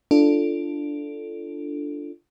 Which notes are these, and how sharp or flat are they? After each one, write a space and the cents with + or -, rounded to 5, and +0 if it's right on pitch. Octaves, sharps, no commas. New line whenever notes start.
D4 +0 F4 -25 A4 +0